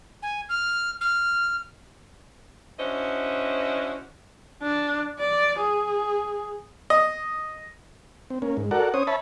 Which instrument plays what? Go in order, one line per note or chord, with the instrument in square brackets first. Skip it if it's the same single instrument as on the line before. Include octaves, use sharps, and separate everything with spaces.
[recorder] G#5
F6
F6
[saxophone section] C#4 D4 E4 F#4 C5 D#5
[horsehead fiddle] D4
D5
G#4
[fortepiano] D#5
[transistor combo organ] C4
A#3 C#4
G#2
F#4 A4 A#4 D5 F#5
C#4 C5 C#5 D#6
C#5 E5 A5 B5